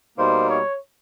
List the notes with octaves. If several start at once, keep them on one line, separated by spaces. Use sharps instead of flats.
B2 G3 A#3 D#4 C5
C#5